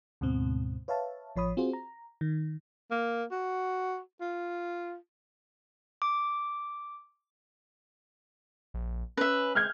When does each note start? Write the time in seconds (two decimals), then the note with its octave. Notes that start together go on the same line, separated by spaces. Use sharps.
0.21 D2 G#2 B2 C4
0.88 B4 C#5 E5 F5 A5
1.36 A1 F3 C#5 B5 D#6
1.57 C4 F4 F#4 G#4 C5
1.73 A#5
2.21 D#3
2.91 A#3
3.31 F#4
4.21 F4
6.02 D6
8.74 A#1
9.17 C#4 B4 E5
9.55 G#3 F6 G6 G#6